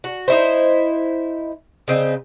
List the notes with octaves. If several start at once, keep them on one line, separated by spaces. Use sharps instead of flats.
F#4
D#4 E4 C5
C#3 C4 D#5